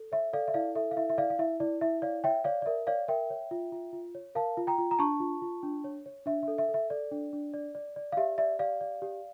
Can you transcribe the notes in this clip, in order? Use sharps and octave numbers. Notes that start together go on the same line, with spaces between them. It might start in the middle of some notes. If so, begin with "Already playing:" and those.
Already playing: A4
C#5 E5
A4 D5 F5
E5
E4 D5 F5
A4 E5
F5
E4 E5
E5
E4 D5 F5
F5
E4 E5
E4 D5
E4 E5
C#5 D5 F5
C#5 E5 G5
C#5 D5 F5
D5
A#4 E5
C#5 D5 F5
A#4 E5 G5
C#5
F4
F4
F4
C#5
A#4 F5 A5
F4
G5 A#5
F4
A#5
D4 A5 C#6
F4
F4
D4
C#5
C#5
D4 E5
E5
A4
E5
A4
E5
A4 D5
D4
D4
D5
D5
D5
F5
G4 E5
D5 E5
G4 D5 F5
D5
G4